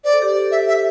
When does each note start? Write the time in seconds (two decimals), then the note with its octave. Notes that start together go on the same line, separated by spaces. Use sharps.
0.04 C5 D5
0.13 A4
0.22 G4 C5
0.51 E5
0.68 E5